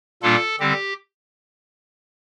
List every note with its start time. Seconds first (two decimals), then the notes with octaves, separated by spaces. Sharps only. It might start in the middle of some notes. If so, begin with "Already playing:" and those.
0.23 A#2 G3 A#3 D4 F4 A4
0.60 D3 G3 C4 G4